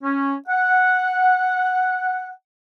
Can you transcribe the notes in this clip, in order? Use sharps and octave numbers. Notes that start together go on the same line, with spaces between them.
C#4
F#5